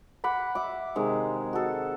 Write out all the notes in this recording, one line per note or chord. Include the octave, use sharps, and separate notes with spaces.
F#5 B5 D6
E5 F#5 D6
C3 D#3 G#3
F#4 A4